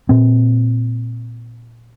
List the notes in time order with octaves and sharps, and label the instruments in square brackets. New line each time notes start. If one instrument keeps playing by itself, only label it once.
[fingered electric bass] A#2 C4